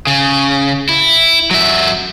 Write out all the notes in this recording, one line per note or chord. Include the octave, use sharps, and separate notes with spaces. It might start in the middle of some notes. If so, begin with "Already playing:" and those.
C#3
E4
F#3 E5